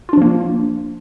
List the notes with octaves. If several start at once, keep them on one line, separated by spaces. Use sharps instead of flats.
F3 A#3 D4 F4